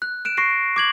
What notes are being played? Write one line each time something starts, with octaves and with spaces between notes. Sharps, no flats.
F#6
F#6 D7 E7
C#6 A#6 C7 D7
D6 G#6 F#7